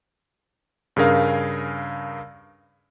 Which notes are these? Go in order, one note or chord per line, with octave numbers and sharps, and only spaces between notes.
G2 C#3 G#4 A#4 F5